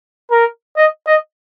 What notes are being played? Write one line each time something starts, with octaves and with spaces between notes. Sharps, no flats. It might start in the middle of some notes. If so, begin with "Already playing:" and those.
A#4
D#5
D#5